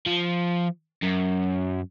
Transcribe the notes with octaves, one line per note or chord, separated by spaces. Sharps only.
F3
F#2